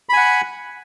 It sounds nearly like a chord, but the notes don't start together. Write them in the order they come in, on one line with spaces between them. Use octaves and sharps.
B5 G#5 F#5